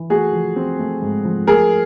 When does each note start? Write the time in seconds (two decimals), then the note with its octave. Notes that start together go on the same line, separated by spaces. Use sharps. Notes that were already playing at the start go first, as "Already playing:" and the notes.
Already playing: E3
0.10 A3 F#4 G#4
0.33 F3
0.56 C4
0.79 A3
1.02 G#2
1.25 F3
1.47 A3 G#4 A#4